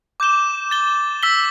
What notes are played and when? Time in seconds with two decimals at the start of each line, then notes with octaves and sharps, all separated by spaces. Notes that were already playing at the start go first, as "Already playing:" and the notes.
0.20 D6 G6 E7 G7
0.71 A6 G7
1.23 E6 B6 G7